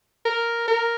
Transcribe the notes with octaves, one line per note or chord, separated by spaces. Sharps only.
A#4
A#4